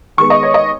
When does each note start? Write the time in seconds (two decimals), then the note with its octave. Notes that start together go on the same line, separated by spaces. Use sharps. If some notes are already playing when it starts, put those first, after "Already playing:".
0.17 D#3 G#3 B3 C#6
0.30 D#5
0.43 C#5
0.54 D#5